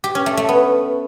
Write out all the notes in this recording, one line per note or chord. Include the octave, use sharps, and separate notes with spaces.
G4
C#4
A3
A3
B3